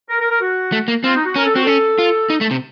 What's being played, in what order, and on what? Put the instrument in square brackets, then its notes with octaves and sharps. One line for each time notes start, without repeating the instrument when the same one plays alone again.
[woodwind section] A#4
A#4
A#4
F#4
[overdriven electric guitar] A3
A#3
[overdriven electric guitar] C4 [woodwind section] F4
[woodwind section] D#4
F#4
[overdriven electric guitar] C#4 [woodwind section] A#4
[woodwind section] A4
[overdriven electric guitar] C4 [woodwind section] F#4
[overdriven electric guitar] C#4 [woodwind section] A4
[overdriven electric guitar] F4
D#4
A3
C3